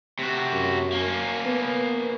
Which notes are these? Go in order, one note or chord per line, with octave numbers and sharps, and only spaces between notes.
C3 F#4
F#2
A#3 C#4
B3